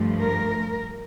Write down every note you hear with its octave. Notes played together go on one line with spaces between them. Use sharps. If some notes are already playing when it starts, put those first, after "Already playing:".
Already playing: G2 F3 A3
A#4